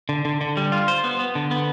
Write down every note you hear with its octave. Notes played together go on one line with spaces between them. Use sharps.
D3
D3
D3
G3
F4
C5
B3
B3
D3
B3